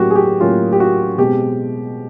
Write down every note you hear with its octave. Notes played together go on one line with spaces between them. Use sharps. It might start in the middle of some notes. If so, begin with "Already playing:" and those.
Already playing: A2 F#3 A#3 C#4 F#4 G4
G#4
G4
A2 F#3 A#3 C#4 F4
G4
F#4
B2 G#3 C4 G4